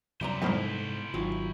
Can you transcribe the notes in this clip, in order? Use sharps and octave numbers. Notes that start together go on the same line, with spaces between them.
F#2 C3 G3 B3 E4 C5 D5 A#5
E2 G#2 F3 A3 A#3
G#1 D#3 F#3 F4